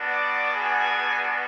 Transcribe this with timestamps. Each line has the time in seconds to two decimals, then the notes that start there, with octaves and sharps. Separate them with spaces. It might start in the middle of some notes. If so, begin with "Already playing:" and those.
Already playing: G3 B3 D4 F#4
0.10 D5 D6
0.52 G#4 G#5